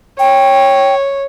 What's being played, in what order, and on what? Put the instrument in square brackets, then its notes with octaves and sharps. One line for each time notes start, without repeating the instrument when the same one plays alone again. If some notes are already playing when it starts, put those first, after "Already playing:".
[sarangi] C#5 [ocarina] G5